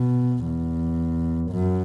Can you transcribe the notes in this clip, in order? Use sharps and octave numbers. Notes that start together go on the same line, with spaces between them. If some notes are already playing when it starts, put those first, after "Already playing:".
Already playing: B2
E2
F#2